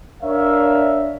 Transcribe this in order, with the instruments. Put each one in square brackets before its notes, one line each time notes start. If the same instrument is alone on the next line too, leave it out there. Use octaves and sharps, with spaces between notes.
[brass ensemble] D4 A#4 C#5 E5 F5